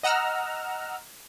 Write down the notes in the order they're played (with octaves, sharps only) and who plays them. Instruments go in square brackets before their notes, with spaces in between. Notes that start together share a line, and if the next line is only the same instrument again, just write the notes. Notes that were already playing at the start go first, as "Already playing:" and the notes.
[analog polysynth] D#5 F#5 A#5 E6 F6